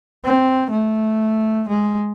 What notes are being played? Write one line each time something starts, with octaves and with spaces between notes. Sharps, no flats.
C4
A3
G#3